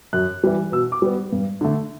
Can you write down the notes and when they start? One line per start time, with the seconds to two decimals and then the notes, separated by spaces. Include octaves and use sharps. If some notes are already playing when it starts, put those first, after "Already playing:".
0.13 F#2 F#6
0.44 E3 G3
0.72 B2 E6
0.92 D6
1.02 G3 B3
1.33 G2
1.61 D3 A3